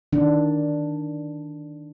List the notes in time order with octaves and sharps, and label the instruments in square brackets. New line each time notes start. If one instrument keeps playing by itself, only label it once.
[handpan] D#3 D4